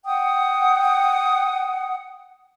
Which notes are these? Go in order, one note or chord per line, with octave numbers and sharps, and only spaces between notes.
F#5 G5 D#6